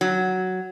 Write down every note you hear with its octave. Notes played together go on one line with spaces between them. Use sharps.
F#3